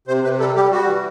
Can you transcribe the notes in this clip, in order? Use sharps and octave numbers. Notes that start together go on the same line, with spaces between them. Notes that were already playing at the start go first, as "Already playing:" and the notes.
C3 C5
C3 B4
G3 A4
G3 G4
G3 F#4
E3